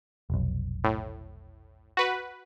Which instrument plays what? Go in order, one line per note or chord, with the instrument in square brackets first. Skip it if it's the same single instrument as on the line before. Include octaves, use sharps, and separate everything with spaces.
[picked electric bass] F1 B1
[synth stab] A2
F#4 B4